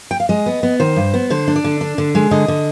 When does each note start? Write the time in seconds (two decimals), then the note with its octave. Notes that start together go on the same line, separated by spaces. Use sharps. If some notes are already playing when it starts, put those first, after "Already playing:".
0.11 G5
0.20 F5
0.29 G#3 D#5
0.46 B3
0.63 B3
0.80 D#3 C5
0.96 G2
1.14 B3
1.30 D3 C5
1.48 D4
1.56 D5
1.64 D3
1.81 D4
1.98 D3
2.15 G#3
2.31 D3 D#5
2.48 D3